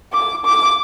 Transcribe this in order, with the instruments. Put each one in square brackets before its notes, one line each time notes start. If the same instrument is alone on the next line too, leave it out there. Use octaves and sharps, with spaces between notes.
[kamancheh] D6
D6